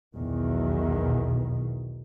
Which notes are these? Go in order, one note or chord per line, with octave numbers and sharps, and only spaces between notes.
B1 E2 D#3